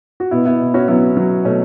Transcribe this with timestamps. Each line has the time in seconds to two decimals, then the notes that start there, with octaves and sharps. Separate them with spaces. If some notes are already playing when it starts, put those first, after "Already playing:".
0.20 F#4
0.31 B2 B3 E4
0.45 B3 E4
0.59 B2
0.74 C#4 F#4
0.88 F#3 B3 E4
1.17 F#3
1.45 B2 A3 C#4